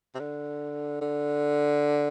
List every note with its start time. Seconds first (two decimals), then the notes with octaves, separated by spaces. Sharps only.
0.15 C3
0.20 D3
1.01 D3